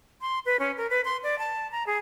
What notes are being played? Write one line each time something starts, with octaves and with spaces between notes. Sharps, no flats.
C6
B4
C#4
A#4
B4
C6
D5
A5
A#5
G#4